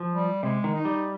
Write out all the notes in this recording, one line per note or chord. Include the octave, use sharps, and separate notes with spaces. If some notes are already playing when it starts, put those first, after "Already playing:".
Already playing: F3
G3
C3 G#3
D#3
D#4
G3